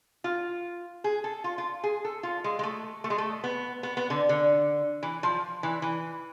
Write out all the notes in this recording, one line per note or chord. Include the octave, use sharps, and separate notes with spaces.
F4
G#4
A4
F4
F4
G#4
A4
F4
G#3
G#3
A3
A3
G#3
A3
B3
B3
B3
D3
D3
E3
F3
E3
E3